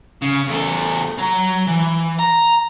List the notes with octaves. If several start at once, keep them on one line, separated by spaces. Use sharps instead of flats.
C#3
E2 A3
F#3 A#5
E3
A#5